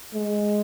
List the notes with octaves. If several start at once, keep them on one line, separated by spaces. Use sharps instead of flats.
G#3